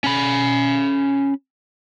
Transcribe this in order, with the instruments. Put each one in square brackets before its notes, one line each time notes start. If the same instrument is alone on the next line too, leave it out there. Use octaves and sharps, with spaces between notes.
[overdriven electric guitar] C#4 B5